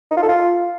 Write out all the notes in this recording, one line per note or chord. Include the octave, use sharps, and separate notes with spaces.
D#4
F4
A4
F4